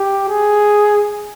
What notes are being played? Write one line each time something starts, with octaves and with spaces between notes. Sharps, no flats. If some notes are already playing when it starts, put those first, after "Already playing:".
Already playing: G4
G#4